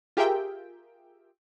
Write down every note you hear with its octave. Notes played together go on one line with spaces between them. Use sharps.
F4 G4 G#4 A#4 E5 G5